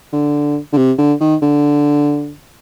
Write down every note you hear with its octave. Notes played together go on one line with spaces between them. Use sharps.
D3
D3
C3
D3
D#3
D3